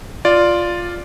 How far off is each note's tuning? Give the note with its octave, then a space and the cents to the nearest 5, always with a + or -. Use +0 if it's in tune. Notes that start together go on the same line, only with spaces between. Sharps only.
F4 +0 D5 +0